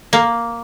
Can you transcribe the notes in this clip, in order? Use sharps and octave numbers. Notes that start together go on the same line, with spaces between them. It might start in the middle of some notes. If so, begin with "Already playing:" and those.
A#3